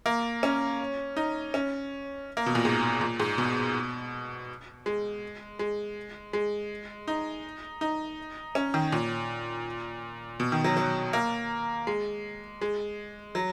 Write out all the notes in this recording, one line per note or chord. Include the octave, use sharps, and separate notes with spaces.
A#3
C#4
D#4
C#4
A#3
B2
A#2
G#2
A#2
G#2
B2
G#3
G#3
G#3
D#4
D#4
C#4
D#3
A#2
B2
D#3
F#3
F#3
A#3
G#3
G#3
F#3